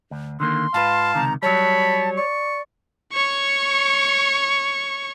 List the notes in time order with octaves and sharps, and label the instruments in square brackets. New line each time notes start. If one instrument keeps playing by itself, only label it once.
[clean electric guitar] D2
[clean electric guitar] D3 D#3 A#3 [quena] C6
[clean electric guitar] G#2 F4 B4 [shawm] F5 [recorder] A5
[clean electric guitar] C#2 C3 D#3 [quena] A#5
[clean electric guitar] F#3 G3 [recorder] C#5 [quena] A5 [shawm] B5
[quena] D5 [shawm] C#6
[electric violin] C#5 C#6